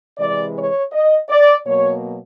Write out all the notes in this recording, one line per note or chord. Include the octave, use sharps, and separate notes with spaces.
C3 E3 G#3 D5
C#5
D#5
D5
B2 F#3 A#3 C#5